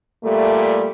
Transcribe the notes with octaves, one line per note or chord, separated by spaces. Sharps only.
A#2 G3 A3